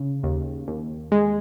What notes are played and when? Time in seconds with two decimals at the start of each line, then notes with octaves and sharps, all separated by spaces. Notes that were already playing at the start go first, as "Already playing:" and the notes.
Already playing: C#3
0.23 D#2
0.68 D#2
1.12 G#3